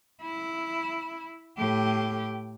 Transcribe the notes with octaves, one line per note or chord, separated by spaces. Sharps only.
E4
A2 G4